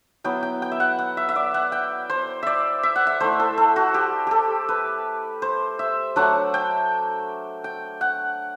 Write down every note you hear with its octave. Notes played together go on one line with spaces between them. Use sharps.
F#3 B3 E4 G5
G5
G5
E5
F#5
F#5
E5
E5
D5
F#5
G5
C5
D5 E5
E5
F#5
E5
A3 E4 C5
A4
A4
F#4
G4
G4 A4
B4
C5
E5
F#3 A3 D4 F#5
G5
G5
F#5